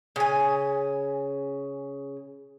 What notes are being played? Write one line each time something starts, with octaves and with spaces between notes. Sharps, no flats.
C#3 G#5